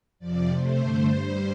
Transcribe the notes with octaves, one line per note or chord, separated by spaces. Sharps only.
F2 C3 F3 D5
C3 A3 C5
G2 D3 A3
G2 G3 C5